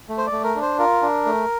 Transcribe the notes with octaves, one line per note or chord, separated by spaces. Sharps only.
A3
C5
D5
A3
A#4
D4
C5
F4 A#4
D4
A3